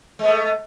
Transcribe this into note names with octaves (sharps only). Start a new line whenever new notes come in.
G#3 A3 B3